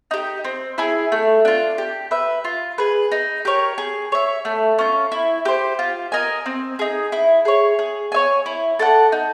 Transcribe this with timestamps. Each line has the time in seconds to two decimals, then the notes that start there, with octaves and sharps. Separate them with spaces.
0.11 D#4 G4
0.44 C4
0.78 E4 G#4
1.12 A3
1.45 D4 F4
1.78 G4
2.11 B4 E5
2.44 F4
2.78 G#4 B4
3.12 D#4
3.45 G4 A#4 C#5
3.78 G#4
4.12 C#5 E5
4.45 A3
4.79 C#4 F4
5.12 E4
5.45 G4 C5
5.79 F4
6.12 A#4 D#5 G#5
6.46 C4
6.79 D#4 G#4
7.12 E4
7.45 G#4 C#5
7.79 G#4
8.12 C#5 E5 G#5
8.46 E4
8.79 A4 D5 F#5
9.12 D#4